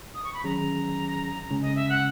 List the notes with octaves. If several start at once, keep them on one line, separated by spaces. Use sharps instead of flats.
D#6
C#6
B5
D#3 F#3 C#4 G#4 A#5
C#3 G#3 C#4
D#5
E5
F#5